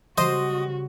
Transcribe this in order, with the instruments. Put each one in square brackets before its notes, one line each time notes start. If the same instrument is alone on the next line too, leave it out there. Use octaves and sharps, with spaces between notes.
[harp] C#3 G3 [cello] F#4 [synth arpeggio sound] C5 [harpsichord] D#5